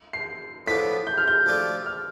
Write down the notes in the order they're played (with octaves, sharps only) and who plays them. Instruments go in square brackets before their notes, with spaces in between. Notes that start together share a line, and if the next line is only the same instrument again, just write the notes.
[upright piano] C7
[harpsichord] A2 F3 B3 D4 [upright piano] B6
[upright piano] G6
F6
G6
[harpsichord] F3 A3 D4 G4
[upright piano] F6